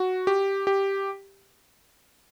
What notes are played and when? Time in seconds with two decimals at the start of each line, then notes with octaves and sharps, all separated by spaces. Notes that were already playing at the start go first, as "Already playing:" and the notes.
Already playing: F#4
0.27 G4
0.67 G4